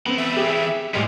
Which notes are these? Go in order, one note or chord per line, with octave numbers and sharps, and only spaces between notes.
B3 C4 A4 B5
E3 G3 E5
G4 G#4
A2 G3 G#3 B3 F4